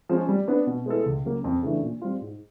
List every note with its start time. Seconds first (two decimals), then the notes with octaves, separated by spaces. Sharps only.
0.09 F3 G#3 C#4
0.29 G3
0.48 B3 D4
0.67 B2
0.86 G#3 B3 E4 A4
1.06 C#2
1.25 C#3 F#3 A#3
1.44 F2
1.63 C#3 E3 A3 D4
1.82 A#2
2.02 G3 C4 F4
2.21 G#2